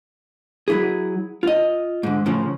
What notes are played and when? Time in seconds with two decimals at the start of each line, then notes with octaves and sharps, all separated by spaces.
0.68 F#3 E4 G#4
1.43 F4 D#5
2.03 G#2 D3
2.26 A2 C#3 F3